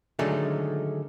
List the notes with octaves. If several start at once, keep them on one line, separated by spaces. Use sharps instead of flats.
D3 D#3 F#3 G#3 A3 C#4